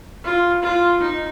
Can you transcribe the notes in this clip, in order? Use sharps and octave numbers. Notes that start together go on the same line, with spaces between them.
F4
F4
D#4